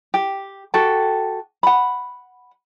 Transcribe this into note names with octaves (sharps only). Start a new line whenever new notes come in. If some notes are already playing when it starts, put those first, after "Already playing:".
G4
F#4 G4 A4 G5
F#5 B5